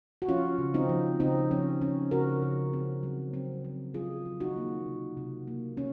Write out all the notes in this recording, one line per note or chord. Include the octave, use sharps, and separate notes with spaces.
F#4
F3 C#4 F4
C#3
C4 D#4
F3
C#3 C4 D#4
F3 C#4
F3 C#4
C#3 F#4 A#4
C#3
C4
F#3
C4
C4
F#3 F4 G#4
F#3
D#4 F#4
A#3
C3
C3
A#3
C#4